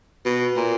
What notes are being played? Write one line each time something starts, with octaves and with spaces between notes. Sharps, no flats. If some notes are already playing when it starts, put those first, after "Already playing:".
B2
A#2